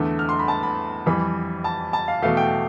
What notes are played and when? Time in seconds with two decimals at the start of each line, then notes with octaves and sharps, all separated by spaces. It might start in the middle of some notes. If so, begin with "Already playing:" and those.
Already playing: E2 D3 A3
0.19 F6
0.29 C6
0.39 B5
0.48 A5
0.63 B5
1.06 F2 E3 G3 B5
1.64 A5
1.93 A5
2.08 F5
2.22 E2 B2 A3 F5
2.37 G5